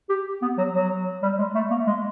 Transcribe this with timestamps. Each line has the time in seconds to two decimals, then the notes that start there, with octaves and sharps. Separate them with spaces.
0.09 G4
0.42 B3
0.58 F#3
0.73 F#3
1.22 G3
1.39 G#3
1.55 A3
1.70 A#3
1.87 G#3